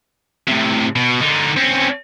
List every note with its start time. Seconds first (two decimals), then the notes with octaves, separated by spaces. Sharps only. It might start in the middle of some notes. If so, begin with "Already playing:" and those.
0.48 A2 C3
0.96 B2
1.21 D3 D#4
1.56 C4 C#4